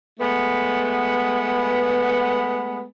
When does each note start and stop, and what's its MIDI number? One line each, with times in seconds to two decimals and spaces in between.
0.20 2.82 56
0.20 2.82 57
0.20 2.82 59